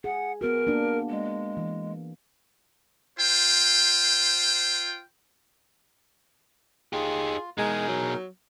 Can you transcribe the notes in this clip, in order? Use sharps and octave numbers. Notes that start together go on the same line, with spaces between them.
G#4 F#5
B3 F#4 A#4
A#3 D4
G#3
E3
F4 C5 G5
D#4 F4 G4 G#4
B2 G#3 D#4 G#4 A#4
F#3